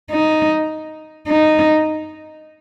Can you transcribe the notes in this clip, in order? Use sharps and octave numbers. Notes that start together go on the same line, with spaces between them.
D#4
D#4